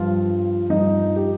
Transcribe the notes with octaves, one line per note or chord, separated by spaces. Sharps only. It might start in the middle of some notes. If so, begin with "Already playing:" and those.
Already playing: G2 F3 F4
G2 F3 D#4
G4